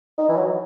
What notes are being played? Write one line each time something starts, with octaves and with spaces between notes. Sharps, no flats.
D#4
E3
F#3